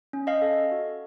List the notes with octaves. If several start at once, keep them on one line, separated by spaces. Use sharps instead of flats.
C#4
D#5 F5
A4
F#4